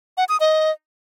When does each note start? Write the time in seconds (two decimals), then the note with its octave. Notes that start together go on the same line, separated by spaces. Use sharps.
0.17 F#5
0.29 D#6
0.40 D#5